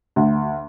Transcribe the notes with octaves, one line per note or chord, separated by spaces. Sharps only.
D2